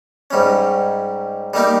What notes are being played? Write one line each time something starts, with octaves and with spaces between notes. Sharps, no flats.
G#2 G3 C#4
G3 A#3 D#4 G4